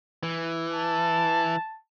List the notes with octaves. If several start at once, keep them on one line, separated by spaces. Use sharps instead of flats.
E3
A5